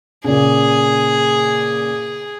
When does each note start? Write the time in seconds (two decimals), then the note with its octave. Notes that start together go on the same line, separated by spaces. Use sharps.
0.24 A#2 C#3 G#4